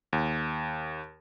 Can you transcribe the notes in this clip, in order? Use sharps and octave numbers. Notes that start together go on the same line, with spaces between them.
D#2